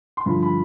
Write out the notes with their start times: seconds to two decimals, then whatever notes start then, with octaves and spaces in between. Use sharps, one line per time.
0.17 C6
0.26 G2 D3 F3 B5
0.43 B5